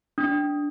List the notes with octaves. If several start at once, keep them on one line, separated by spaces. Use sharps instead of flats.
D4